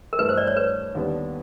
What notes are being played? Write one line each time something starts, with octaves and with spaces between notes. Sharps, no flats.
A#4
G2 E3 A3 B4
C5
D5
C#5
B4
D#2 D3 G3 B3 D4